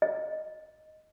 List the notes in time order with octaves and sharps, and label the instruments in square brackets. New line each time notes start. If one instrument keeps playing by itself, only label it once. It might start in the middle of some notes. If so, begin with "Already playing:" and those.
[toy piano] D#5